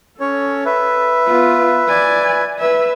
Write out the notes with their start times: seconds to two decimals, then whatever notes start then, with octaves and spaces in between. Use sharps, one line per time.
0.20 C#4 A4 C#5
0.66 B4 E5
1.26 B3 F4
1.88 D5 G#5
2.59 B4 E5